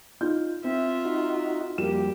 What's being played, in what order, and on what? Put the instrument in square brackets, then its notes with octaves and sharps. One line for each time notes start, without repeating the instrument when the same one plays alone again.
[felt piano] D#4 F4 G6
[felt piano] C4 [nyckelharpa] F4 E5
[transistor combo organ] D#4 F#4
[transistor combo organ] F2 G3 [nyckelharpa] A#3 G4 [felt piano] F#4 E7